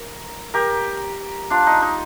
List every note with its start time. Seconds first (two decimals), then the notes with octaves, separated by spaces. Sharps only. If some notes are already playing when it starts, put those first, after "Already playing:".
Already playing: A#4
0.54 G4 A#4
1.50 D4 F4
1.67 D#4
1.82 D#4